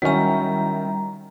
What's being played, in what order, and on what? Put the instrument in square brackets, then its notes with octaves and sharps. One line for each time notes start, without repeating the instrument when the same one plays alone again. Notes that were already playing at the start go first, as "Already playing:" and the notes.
[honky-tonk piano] D#3 E4 [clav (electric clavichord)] F#3 C#4 [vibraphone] G3 A#5